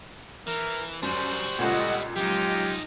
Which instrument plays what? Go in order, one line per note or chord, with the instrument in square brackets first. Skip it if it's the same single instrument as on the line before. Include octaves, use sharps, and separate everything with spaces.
[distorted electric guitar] E3 [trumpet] A#4
[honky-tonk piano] F#2 [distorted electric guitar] G3 F#4 [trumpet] C5
[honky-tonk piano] C#2 A#2 [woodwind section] A4 D#5 F#5
[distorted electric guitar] F3 D#4 [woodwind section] F#3 G#3 F4 [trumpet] G4